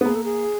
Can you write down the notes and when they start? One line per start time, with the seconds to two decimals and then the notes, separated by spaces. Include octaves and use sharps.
0.01 B3
0.05 A#3 G#4
0.15 A4
0.24 G#4